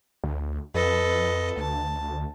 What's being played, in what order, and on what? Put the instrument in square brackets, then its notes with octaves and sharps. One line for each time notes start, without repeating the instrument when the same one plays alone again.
[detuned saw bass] D2
[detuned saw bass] F2 [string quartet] A4 B4 D#5
[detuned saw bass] D2 [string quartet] A5